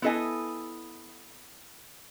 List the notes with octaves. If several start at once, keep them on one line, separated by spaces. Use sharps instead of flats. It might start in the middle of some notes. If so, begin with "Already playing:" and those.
B3 E4 A4 D#5 G#5